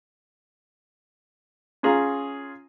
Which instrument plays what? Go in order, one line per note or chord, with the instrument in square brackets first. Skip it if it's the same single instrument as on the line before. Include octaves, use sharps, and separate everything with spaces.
[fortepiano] C#4 F4 G#4 A#5